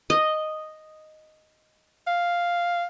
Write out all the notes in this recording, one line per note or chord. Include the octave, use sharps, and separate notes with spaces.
D#5
F5